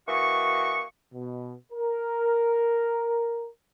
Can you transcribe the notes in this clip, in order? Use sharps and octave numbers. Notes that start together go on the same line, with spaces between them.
E3 A#3 F#4 D#5 C#6
B2
A#4